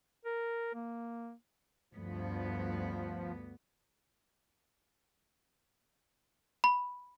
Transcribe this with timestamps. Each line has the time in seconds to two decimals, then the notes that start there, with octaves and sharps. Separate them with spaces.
0.25 A#4
0.75 A#3
1.94 D2 G2 F3 B3
6.64 B5